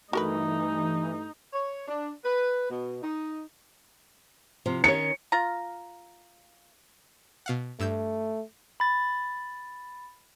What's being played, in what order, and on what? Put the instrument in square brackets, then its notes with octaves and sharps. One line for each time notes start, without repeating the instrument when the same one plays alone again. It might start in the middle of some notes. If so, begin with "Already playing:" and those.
[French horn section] G2 A3 [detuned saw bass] E3 [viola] D#4 [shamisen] F#4 A#4 B4
[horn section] C#5
D4
B4
B2
D#4
[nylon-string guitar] C3 F3
[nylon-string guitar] D#3 C#4 C#5 [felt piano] C#7
[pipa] F4 A#5
[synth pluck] B2 F5 F#5
[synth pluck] G2 E6 G6 [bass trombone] A3
[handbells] B5 A6